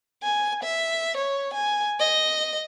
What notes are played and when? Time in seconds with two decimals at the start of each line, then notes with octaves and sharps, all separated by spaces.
0.22 G#5
0.63 E5
1.17 C#5
1.53 G#5
2.00 D#5